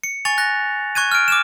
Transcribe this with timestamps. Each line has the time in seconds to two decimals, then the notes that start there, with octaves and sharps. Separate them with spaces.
0.04 C#7
0.25 G#5 C#6 A6 F7
0.38 F#6 A#6
0.95 C#6 F#6 G#6 D#7
1.11 F6 D7
1.28 D6 F6 E7